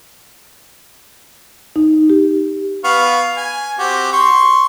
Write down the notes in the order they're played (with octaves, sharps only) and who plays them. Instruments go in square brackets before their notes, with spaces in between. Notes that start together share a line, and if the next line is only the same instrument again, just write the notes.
[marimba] D#4
G4
[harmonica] B3 F5 C#6
G#5
C4 F#4 G4
C6 C#6